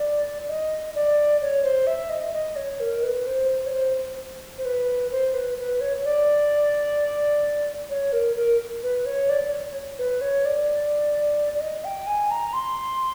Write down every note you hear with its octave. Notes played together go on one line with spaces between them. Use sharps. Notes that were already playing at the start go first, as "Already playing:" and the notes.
Already playing: D5
D#5
D5
C#5
C5
E5
D#5
D#5
C#5
A#4
B4
C5
C#5
C5
C5
B4
C5
B4
B4
C#5
C#5
D5
C#5
A#4
A#4
B4
C#5
D5
C#5
B4
C#5
D5
D5
D#5
G5
G#5
A#5
C6